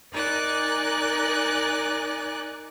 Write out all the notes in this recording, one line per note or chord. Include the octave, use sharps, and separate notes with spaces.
D#4 A#4 D5 G#5 F#6